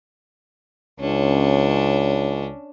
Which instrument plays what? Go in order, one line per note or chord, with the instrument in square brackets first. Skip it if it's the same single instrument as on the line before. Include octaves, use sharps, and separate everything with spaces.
[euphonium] C#2 [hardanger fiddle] C#4 D4